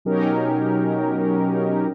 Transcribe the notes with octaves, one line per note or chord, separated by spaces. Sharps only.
B2 F#3 C#4 D#4 G4 A#4